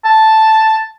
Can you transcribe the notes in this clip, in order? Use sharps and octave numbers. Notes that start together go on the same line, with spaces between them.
A5